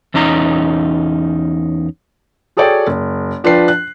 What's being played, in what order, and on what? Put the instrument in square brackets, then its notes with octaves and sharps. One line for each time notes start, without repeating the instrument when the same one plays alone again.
[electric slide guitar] E2 C#4 D#4 A#5
[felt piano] F#4 G#4 A4 C#5 D5 G5
F#1
F3 D4 F4 B4 G5 C7
F#6